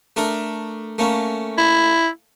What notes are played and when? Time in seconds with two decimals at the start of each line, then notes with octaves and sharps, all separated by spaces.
0.16 A3 D4 A#4
0.98 A3 A#3 C#4
1.58 E4